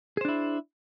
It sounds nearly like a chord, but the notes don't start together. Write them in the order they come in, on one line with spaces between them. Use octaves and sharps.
G#4 C5 D4 E4